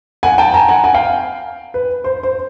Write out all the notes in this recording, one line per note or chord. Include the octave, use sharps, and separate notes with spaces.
F#5 G#5
G5 A5
G#5 A#5
F#5 G#5
F#5 G#5
F5 G5
B4
C5
C5